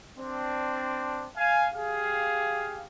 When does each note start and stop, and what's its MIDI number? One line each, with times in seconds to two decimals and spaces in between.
0.18 1.25 60
0.18 1.25 62
1.36 1.67 77
1.36 1.67 80
1.73 2.87 67
1.73 2.87 68
1.73 2.87 77